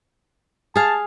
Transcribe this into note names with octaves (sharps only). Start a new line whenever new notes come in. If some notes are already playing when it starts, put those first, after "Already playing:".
G#4 F5 A5